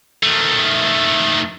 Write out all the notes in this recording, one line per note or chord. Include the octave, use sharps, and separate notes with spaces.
D#3 A3